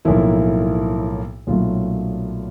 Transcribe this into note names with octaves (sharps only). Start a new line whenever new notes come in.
B1 A2 F3 A#3 E4
B1 A#2 F#3 A3 F4